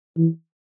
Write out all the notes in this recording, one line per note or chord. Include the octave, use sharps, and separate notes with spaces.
E3